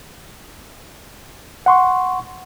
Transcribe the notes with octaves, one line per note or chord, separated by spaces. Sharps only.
F#5 C6 C#6